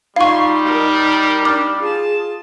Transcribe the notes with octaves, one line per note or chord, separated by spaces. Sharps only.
G3 D#4 F4 F5 C6 C#6
A#4
D4 D6 F6
F4 G#4 A5